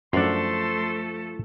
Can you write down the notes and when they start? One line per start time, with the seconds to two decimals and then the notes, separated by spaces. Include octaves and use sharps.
0.13 F#2 F3 A3 D4 A4 C6